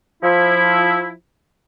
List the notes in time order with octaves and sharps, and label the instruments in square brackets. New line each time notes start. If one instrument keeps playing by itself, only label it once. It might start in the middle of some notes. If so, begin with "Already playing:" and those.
[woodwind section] F3 E4